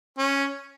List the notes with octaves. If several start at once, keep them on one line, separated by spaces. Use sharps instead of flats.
C#4